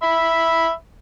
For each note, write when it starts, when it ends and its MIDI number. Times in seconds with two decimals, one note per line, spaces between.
0.03 0.70 76
0.03 0.70 83